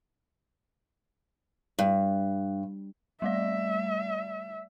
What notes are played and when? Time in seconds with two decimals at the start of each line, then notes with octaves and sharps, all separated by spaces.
1.79 G2
3.22 G3 A3 D5 E5